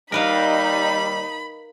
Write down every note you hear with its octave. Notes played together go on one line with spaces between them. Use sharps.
D#2 G3 D#4 A#4 B4 F5 B5